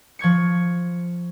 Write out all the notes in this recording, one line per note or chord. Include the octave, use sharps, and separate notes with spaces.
F3 C#6 G#6 C#7